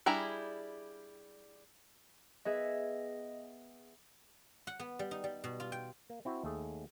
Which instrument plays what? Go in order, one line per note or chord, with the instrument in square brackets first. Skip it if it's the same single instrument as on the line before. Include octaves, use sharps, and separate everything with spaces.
[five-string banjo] G3 D4 E4 G#4 A#5
[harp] B3 G#4 E5 [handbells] D#5
[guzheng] F#5
B3
G3
D#4
G3
B2
F4
G5
[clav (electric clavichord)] A#3
C4 E4 F#4
D#2 A3 G#4